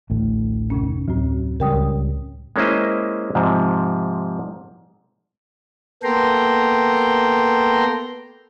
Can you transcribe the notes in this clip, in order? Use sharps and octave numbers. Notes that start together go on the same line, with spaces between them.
A1 D2 A2
F2 C3 C#4
D2 A2 F#3
C#2 G3 C#4 A#4 G5 D#6
G#3 A#3 C#4 E4 C5 D#5
G#2 C3 F3
A#3 B3 A4 G5 A#5 C6